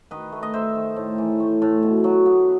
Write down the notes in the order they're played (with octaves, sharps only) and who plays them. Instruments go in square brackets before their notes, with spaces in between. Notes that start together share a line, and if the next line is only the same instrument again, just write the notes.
[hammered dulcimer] D#3 B4 D#5
A3
D#5
D#4 C5 E5
D#3
A2
E3
A3
A2
B2
F#3
B3